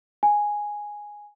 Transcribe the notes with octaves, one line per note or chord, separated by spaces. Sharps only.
G#5